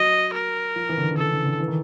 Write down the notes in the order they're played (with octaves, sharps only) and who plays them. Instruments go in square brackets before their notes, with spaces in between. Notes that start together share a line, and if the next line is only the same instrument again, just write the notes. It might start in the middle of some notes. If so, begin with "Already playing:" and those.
Already playing: [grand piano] F#3 [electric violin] D#5
[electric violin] A#4
[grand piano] F3
E3
D3
D#3
C#3
[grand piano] D3 [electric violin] A4
[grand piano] C#3
D3
E3
D#3